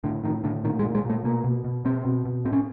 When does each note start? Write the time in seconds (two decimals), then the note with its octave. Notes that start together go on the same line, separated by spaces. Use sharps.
0.04 A2 D3
0.24 A2 D#3
0.44 A2 D3
0.64 A#2 D#3
0.79 G#3
0.85 A#2
0.95 G#3
1.04 A#2
1.10 A3
1.24 B2 A#3
1.44 B2
1.65 B2
1.85 B2 C4
2.05 B2
2.25 B2
2.45 A2 C4
2.53 C#4